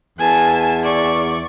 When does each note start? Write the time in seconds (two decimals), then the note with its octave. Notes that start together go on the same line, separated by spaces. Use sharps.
0.18 E2 G#5 A5
0.83 D5 C#6